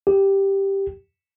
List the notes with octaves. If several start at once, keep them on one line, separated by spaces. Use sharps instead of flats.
G4